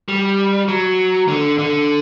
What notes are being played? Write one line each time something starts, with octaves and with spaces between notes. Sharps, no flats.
G3
F#3
D3
D3